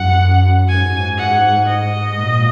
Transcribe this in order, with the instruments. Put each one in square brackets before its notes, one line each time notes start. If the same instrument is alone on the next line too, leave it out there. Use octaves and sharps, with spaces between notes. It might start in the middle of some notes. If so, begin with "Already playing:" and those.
Already playing: [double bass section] F#2 [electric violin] F#5
[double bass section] G#2 [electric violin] G#5
[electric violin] F#5
D#5
[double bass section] A#2